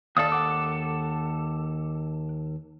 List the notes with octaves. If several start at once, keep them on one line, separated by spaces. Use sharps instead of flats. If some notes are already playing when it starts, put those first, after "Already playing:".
D#2 A4 D5 F5 D#6
F#5 D6